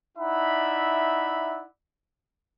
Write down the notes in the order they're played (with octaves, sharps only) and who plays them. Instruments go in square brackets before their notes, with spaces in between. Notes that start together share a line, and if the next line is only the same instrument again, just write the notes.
[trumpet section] D#4 E4 D5 E5 F#5 B5